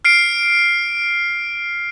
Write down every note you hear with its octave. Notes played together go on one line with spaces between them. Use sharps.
F6 C7 D7